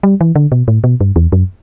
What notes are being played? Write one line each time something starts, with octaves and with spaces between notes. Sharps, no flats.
G3
E3
D3
B2
A2
B2
G2
E2
F#2